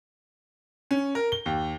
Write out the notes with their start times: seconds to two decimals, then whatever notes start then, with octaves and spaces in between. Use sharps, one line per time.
0.91 C#4
1.15 A#4
1.32 G7
1.46 D#2